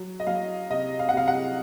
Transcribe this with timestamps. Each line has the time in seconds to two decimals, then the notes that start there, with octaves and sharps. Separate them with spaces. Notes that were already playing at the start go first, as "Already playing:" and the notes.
Already playing: F#3
0.20 D#5
0.27 F#3 F5
0.70 C3 D#5
0.99 F5
1.09 F#5
1.13 C3 F5
1.28 F#5